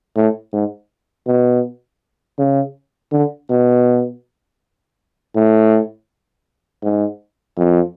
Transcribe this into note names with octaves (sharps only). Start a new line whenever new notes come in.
A2
G#2
B2
C#3
D3
B2
A2
G#2
F2